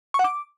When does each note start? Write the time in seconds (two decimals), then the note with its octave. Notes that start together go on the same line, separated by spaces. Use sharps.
0.14 C#6
0.19 F#5
0.24 D6